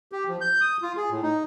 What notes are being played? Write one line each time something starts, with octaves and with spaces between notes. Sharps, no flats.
G4
F3
G6
D#6
F4
G#4
A2
D#4